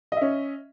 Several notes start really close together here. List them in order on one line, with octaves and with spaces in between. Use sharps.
D#5 E5 C#4